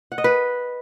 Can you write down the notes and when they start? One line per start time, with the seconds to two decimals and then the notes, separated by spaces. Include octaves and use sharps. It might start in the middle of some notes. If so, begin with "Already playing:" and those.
0.12 F#5
0.18 D#5
0.24 B4